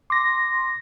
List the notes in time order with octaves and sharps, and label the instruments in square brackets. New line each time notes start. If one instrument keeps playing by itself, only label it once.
[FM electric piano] C6 A#6 [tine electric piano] D6